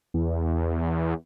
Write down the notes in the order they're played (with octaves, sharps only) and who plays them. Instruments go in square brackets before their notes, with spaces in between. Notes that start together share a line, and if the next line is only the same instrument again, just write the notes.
[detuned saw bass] E2